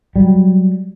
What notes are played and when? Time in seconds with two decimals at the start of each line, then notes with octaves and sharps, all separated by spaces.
0.16 F#3 G3